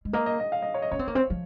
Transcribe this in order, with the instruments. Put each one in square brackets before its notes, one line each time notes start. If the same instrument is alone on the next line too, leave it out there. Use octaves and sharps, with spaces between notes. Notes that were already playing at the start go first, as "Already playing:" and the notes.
[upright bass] G#3
[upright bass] A#3 [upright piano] D#5
[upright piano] D#5
D#5
F5
D#5
C#5
D#5
[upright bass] C#4 [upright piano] C#5
[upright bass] C4
A#3
C4
F3